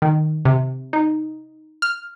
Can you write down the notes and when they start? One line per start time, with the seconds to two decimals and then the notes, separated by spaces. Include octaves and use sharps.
0.02 D#3
0.45 C3
0.93 D#4
1.82 F6